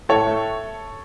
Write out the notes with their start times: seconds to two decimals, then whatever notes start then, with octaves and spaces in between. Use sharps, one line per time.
0.09 A2 A4 C#5
0.27 A3